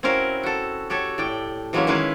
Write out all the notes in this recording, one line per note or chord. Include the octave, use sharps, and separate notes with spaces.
C4 C#4 E4 F#4 A#4 F5
F#4 A4
F#4 G4 A4 C#5
A2 D5 G5
E3 F#3 G#3 A#3 C#4 E4
D#3 G#3 C#4 E4 B4 F5